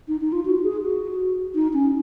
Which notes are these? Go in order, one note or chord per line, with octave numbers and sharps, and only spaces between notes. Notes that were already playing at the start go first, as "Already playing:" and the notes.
D#4
D#4
F4
F#4
G#4
F#4
D#4
C#4